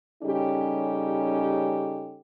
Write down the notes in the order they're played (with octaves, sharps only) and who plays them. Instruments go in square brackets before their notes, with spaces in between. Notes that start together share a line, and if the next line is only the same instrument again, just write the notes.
[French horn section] C#3 G3 C#4 D#4 G4 A4